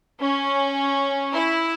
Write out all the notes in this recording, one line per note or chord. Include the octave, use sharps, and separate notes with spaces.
C#4
E4